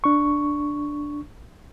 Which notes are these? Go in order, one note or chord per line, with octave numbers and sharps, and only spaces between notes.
D4 C#6